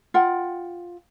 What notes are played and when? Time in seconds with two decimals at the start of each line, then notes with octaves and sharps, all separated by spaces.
0.14 F4 F#5 G5